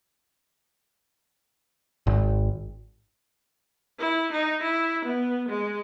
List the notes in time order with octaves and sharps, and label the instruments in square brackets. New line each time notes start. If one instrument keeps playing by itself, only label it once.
[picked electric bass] G#1
[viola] E4
D#4
E4
B3
G#3